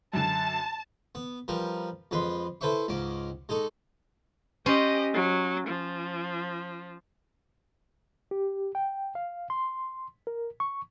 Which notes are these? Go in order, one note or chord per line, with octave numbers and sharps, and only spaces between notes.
F#2 D3 A5
B3
F3 G3 A#4 B4
F2 G#3 B4 B5 C6
E4 A4 B4 C5 E5 C#6
C#2 G#2 C#4 D6
G#3 D#4 A4 C#6
C#4 G4 C5 D#5
F#3
F3
G4
G5
F5
C6
A#4
C#6